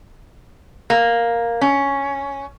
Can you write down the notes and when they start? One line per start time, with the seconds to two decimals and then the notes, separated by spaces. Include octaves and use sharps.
0.90 A#3
1.61 C#4